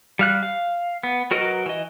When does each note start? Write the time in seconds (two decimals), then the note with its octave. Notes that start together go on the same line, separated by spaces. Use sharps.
0.19 G3 F5 F#6
0.43 F5
1.03 B3
1.31 F#3 F#4 A#4 B4 D#5
1.66 E3 D#5